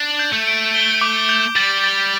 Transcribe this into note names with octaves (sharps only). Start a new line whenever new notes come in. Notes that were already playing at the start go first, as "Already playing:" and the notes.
Already playing: D4
G6
A3
D7
G7
D6
G6
G3 A6
A6